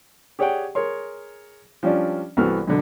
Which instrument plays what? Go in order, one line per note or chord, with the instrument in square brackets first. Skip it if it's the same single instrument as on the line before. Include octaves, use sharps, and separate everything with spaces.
[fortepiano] G4 G#4 C#5 D5 F#5 G5
G#4 A#4 C#5 C6
F3 G3 C#4 D4 D5
C2 E3 B3 F#4 A4 F6
F#2 B2 D3